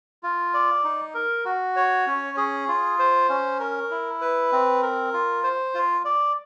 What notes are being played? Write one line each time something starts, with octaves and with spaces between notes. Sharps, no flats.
F4
D5
D#4
A#4
F#4
C#5
C#4
G#4
F4
C5
C#4
A#4
E4
B4
C4
A#4
F4
C5
F4
D5